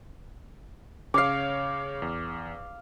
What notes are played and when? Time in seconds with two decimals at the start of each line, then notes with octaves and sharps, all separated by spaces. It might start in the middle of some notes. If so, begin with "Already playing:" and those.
1.14 C#3 C#5 F5 D6 C7
2.02 E2